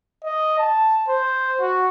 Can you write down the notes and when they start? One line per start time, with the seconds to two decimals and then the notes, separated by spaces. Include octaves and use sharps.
0.24 D#5
0.59 A5
1.08 C5
1.61 F#4